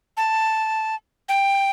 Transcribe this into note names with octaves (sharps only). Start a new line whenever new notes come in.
A5
G5